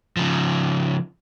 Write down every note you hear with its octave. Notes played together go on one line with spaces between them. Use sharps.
C#3 F3